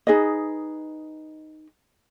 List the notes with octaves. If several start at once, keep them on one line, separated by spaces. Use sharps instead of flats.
D#4 G#4 B4 D#5